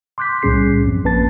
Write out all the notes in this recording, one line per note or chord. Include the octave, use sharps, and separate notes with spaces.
C6 D6 F#6 G6 B6
C2 A2 G3 C#4 G#4 C7
F#2 F3 C4
A1 A#3 C#4 B4 A5 A6